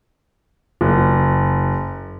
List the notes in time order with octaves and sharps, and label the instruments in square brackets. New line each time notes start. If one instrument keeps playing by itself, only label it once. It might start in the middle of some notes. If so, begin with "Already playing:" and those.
[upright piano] F#1